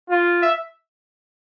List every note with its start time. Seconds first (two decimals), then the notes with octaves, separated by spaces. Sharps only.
0.10 F4
0.42 E5